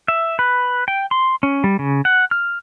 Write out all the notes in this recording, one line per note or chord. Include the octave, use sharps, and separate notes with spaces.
E5
B4
G5
C6
C#4
G3
C#3
F#5
F6